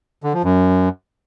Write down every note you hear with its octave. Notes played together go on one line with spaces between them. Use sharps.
D3
F3
F#2